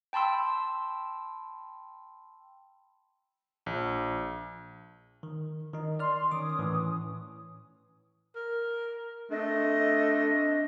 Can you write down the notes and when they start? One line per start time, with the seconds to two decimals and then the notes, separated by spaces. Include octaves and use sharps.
0.13 G5 A5 B5 C6 E6
3.66 A#1
5.23 D#3
5.73 D#3 D#4
6.00 D5 C6 F6
6.31 D#3 C#4 D6 D#6
6.59 A2 E3
8.35 A#4
9.31 A3 C4 D4 D#5